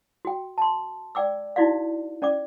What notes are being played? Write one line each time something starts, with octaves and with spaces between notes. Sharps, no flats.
F#4 G5
A5 C6
D5 G5 D6 E6
D#4 E4 F#4 D5 F5
C#4 D5 G5 D6